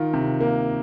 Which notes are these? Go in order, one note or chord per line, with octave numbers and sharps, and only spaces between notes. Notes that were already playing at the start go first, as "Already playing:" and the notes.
Already playing: D#3 F4
C3
A#3